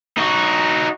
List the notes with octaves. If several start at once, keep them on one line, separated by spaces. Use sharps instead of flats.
D#4 F#4